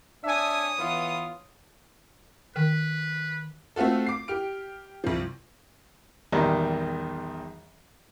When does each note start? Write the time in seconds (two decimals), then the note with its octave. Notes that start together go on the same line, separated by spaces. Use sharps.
0.24 D4 C#5 E5 G#5 D#6
0.79 E3 B3 F4
2.56 D#3 B4
3.76 A3 C4 F4 F#4 A4
4.06 D6 C7
4.28 G4 F6 D7
5.04 C2 F3
6.32 A#1 E2 D#3 G3